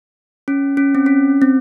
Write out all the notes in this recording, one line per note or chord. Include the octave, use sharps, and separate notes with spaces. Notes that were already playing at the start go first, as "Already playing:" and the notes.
C#4
C#4
C4
C#4
C4